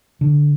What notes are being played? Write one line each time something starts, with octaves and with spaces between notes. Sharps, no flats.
D3